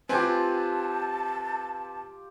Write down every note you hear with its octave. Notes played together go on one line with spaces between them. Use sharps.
C4 F4 G4 B4 G#5 A5